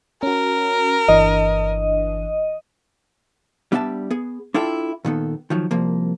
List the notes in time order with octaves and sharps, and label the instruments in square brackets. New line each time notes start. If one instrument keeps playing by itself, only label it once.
[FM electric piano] C#4 F#4 [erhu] A#4
[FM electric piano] G1 E3 D4 [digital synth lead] D#5
[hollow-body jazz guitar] G3 B3 D4 E5 G5 A5
B3 G#4
D4 E4 F4 A4 G5
A#2 D#3 B3 A4
D#3 F3 F#3
C2 F3 A#3